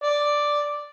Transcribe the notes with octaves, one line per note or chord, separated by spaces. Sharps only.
D5